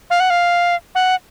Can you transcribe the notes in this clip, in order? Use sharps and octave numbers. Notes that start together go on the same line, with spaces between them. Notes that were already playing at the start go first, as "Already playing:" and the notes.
F5
F#5
F5
F#5